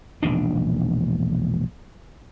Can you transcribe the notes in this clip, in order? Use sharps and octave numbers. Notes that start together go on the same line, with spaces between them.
E1 A#1 D#3 D4